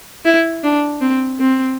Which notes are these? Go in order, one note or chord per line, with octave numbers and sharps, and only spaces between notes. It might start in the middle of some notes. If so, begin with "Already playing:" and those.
E4
D4
C4
C4